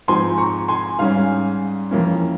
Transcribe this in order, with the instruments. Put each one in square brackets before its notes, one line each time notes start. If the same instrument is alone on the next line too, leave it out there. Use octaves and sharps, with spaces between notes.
[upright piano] G#2 F3 C4 G#5 C6
A#5 C#6
G#5 C6
G#2 G3 C#4 F5 G#5
F2 E3 A#3 C#4